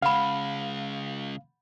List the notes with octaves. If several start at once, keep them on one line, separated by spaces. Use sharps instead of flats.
C#3 G#3 F5 F#5 B5